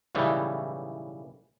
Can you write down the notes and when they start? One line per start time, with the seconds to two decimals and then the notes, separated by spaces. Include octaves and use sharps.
0.15 B1 A2 C#3 E3 G3